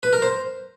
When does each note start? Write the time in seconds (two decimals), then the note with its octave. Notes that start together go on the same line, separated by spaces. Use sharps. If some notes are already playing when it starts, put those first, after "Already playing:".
0.03 B4
0.13 A#4
0.22 C5